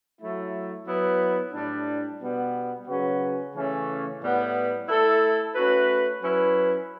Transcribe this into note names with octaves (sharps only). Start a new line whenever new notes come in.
F#3 A3 E4
F#3 B3 E4 B4
A2 G3 D4
B2 G3 B3
C#3 F#3 C#4 F#4 B4
C#3 E3 A3 C#4
A2 G3 B3
A3 E4 A4
A3 C#4 F#4 B4
F#3 C#4 E4 B4